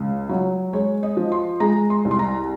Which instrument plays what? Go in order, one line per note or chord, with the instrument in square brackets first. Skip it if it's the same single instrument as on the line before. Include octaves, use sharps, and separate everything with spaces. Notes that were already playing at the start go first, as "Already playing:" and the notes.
Already playing: [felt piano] C#2
F#3
G#3 C#5
D#5
F3
C6
G#3 A#5
C6
C2
C6
A#5